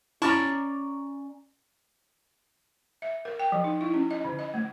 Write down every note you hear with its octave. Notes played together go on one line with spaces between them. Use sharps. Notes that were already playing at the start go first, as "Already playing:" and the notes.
C#4 E4 D5 A5 A#5 C#6
E5
A#4
G5
F3
D#4
E4
C#4
D#5
D3
D#5
A3